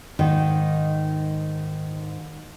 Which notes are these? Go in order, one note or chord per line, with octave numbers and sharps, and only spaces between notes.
G#2 D#3